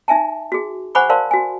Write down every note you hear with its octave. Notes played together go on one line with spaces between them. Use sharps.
D#4 E5 G#5 A5
F#4 G#4
C5 F#5 G#5 B5 C#6 D6
A#4 C5 D5 F5 A5 C6
F#4 G#5